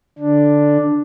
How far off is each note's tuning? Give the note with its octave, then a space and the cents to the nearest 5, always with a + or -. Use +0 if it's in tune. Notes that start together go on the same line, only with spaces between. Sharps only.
D3 +0 D4 +0